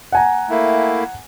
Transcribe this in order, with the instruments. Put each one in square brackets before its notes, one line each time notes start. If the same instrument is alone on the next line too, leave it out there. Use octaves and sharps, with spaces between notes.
[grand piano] F#5 G#5 A#5
[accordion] A3 A#3 E4